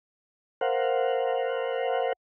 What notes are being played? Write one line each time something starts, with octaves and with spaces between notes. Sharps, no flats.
A#4 C5 F5 F#5